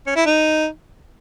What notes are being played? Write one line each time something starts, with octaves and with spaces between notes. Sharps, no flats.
C#4
E4
D#4